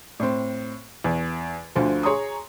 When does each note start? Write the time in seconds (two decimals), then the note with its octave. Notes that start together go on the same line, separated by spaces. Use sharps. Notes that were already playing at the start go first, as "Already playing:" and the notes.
0.20 A2 C4
1.04 E2
1.76 D2 D3 F3
2.03 G#4 C#5 A#5 C6 D#6